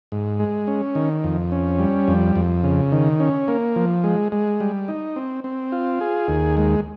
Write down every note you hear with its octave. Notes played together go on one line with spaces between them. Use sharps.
G#2
G#3
C#4
D#3
F2
C#4
G3
F2
F2
C#3
D#3
C#4
A#3
F3
G#3
G#3
G3
D#4
C4
C4
F4
G#4
D#2
G#3